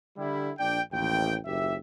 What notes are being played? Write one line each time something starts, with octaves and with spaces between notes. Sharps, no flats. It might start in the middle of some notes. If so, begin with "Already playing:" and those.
D3 G3 E4
A#1 D4 D5 G5
A1 D#2 G5
F#1 D#2 G4 E5